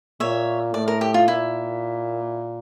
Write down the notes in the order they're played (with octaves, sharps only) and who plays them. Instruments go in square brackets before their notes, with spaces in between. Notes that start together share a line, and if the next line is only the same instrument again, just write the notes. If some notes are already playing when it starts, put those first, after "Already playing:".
[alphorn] A#2 [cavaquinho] C#5 E5
[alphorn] A2 [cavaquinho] D5
[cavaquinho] A#4
G4
F4
[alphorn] A#2 [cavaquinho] E4